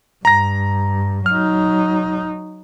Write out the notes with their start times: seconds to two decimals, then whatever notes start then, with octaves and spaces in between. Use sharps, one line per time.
0.25 G2 A#5 A#6
1.26 F#3 D#4 F6